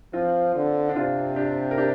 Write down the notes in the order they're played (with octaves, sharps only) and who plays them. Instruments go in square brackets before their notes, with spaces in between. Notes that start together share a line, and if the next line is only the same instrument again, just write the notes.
[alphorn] F3 [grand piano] C4 F4
[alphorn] D3
[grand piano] D4
[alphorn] C3 [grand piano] C4 F4
[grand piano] D4 G4
A#4
D4 G4